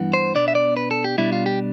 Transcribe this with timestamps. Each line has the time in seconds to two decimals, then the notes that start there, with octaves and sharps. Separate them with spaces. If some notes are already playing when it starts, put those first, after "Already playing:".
Already playing: G2 E3 B3
0.13 C5
0.35 B2 B3 D4 D5
0.48 E5
0.55 D5
0.77 B4
0.91 A4
1.04 G4
1.18 B2 G3 D4 E4
1.32 F4
1.46 G4